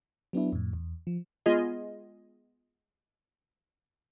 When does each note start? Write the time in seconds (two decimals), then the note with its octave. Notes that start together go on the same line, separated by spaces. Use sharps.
0.33 F#3 B3 D4 E4
0.53 F2 A2
0.73 E2
1.07 F3
1.46 G#3 B3 F4 G#4 D#5